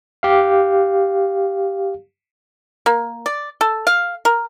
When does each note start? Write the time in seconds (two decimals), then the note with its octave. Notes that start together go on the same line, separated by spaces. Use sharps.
0.23 G4 F5
2.86 A#3
3.26 D5
3.61 A4
3.87 F5
4.25 A#4